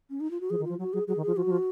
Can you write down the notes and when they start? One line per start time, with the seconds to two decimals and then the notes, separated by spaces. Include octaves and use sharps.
0.10 C#4
0.20 D#4
0.31 F4
0.41 F#4
0.50 F3 G#4
0.59 D#3
0.64 F3 F4
0.79 F#3 F#4
0.93 F#3 G#4
1.07 F#3 G#4
1.17 D#3
1.22 F3 G#4
1.37 F3 F#4
1.46 F#3
1.51 F3